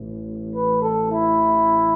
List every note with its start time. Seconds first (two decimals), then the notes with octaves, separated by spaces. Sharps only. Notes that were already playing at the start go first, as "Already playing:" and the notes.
Already playing: A1 A2 E3
0.53 B4
0.81 A4
1.10 E4